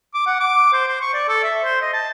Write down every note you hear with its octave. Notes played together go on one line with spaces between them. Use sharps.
D6
F#5
D6
C5
C5
C#6
D5
A4
E5
C5
D#5
A5